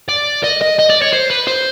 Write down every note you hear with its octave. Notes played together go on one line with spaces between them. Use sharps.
D5
D#5
D#5
D#5
D5
C#5
C5
B4
C5